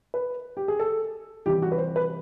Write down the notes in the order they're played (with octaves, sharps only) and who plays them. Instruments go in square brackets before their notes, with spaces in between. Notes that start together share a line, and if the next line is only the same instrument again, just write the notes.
[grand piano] B4
G4
G#4
A4
C3 E3 G3 G4
F#4
B4
C5
B4